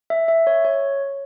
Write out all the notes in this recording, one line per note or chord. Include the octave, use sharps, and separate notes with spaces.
E5
E5
C#5
C#5